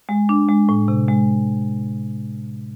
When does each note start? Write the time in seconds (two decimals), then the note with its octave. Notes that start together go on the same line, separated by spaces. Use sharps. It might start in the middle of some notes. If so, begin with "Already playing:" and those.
0.09 G#3
0.29 D4
0.49 G#3
0.69 A2
0.88 C3
1.08 G#3